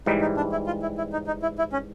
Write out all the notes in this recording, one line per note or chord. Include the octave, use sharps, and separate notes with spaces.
G#2 E3 G3 D#4
D#4
D4
E4
F4
E4
E4
D#4
D#4
E4
E4
C#4